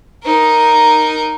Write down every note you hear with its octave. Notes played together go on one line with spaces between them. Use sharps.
D#4 A#4